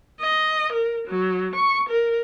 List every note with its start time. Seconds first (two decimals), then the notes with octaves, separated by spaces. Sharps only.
0.21 D#5
0.73 A#4
1.08 F#3
1.56 C#6
1.89 A#4